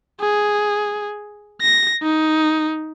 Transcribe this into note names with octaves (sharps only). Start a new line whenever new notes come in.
G#4
A#6
D#4